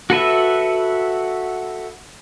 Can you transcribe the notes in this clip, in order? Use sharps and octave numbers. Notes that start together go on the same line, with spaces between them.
F#4 A4 B4 E5